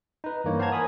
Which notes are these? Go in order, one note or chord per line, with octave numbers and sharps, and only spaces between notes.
D#4 B4
G2 E3 A#3 C#5
C5 F5 F#5 A5 A#5 G#6
A#4 G#5 B5 D#6